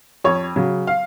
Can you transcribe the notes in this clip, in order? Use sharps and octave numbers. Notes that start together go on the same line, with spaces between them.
F2 C#5
C#3 F#3
F5